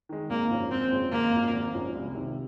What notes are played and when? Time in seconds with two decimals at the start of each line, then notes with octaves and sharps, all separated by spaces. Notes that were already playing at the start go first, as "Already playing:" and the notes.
0.09 D#3 G#3
0.29 G#1 A#3
0.50 G#2 F3 G#3 C#4
0.70 G#1 C4
0.91 G#2 F3 G#3 C#4
1.12 G#1 A#3
1.33 G#2 F3 G#3 C#4
1.53 G#1
1.74 G#2 F3 G#3 C#4
1.95 C2
2.15 C3 D#3